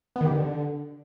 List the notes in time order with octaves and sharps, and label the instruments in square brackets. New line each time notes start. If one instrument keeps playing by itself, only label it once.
[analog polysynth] B3
D#3
G4
D3